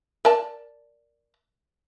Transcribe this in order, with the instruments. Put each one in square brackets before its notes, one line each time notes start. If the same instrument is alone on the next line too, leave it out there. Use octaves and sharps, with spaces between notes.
[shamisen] A#4 D5 A5